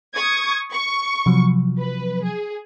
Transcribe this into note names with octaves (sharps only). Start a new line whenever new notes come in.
C#6 D#6 G#6
C#6
C3 F3 F#3
B4
G#4